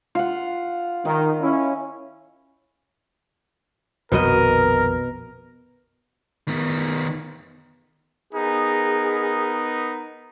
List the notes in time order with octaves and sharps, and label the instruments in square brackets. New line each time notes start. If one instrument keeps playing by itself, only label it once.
[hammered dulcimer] F4 F#5
[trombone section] D#3 [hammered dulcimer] D#5
[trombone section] C#4 E4
[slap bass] A#1 F2 D#3 [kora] B2 B3 D#5 [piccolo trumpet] A#4
[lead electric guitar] D#3 B3
[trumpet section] B3 D#4 A#4 [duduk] G#4